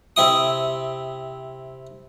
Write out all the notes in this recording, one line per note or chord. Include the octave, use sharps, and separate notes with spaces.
C3 C4 E4 D#6